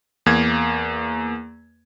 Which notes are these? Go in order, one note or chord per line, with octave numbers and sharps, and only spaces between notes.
E2 A#3 G#6